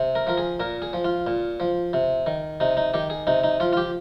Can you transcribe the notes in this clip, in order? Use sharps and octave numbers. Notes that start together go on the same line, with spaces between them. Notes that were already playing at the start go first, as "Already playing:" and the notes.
Already playing: C3
A#4
F3 A#4
G#4
A#2 A#4
G#4
F3
F4
A#2
F3
C3
D#3
C3 D#4
D#4
D#3 G4
G#4
C3 D#4
D#4
F3 F4
F4
G4